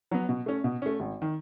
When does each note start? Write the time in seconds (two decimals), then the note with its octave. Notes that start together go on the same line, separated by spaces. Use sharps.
0.11 F#3 B3
0.29 B2
0.46 A3 C#4
0.64 B2
0.82 A3 C#4
1.00 G#1
1.22 D#3